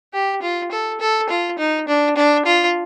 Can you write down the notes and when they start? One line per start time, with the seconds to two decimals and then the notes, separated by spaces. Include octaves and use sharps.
0.14 G4
0.42 F4
0.72 A4
1.00 A4
1.29 F4
1.59 D#4
1.88 D4
2.16 D4
2.46 F4